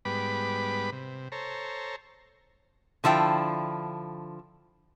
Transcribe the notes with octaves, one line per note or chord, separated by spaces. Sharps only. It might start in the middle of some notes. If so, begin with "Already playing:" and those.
G#2 G3 B3 B4 B5 D6
C3
A4 C5 C#5 A#5
D3 F3 E4 G5